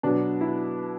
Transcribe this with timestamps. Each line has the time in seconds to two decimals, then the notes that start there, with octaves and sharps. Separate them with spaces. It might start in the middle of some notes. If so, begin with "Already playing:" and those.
0.03 B2 F#3 B3 D4
0.41 E4